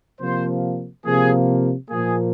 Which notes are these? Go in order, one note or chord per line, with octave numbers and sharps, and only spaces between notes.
C3 F3 A#3 C5
C3 F3 A#3 G#4
A#2 F3 A#3 G#4